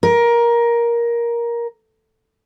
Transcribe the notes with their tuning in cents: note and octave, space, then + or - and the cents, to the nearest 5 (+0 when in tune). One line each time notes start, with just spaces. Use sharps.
A#4 +15